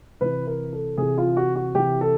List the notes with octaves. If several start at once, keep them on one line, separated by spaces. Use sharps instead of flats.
C3 E3 B4
A#4
A4
C3 E3 G#4
F4
F#4
F#4
C3 E3 G4
A4